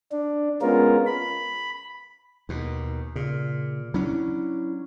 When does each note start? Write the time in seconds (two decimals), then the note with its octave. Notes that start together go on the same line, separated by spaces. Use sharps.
0.12 D4
0.62 G#3 B3 C#4 F4 A#4
1.06 B5
2.49 D#2 B2
3.16 A#2 C#3
3.94 F#3 C#4 D4 E4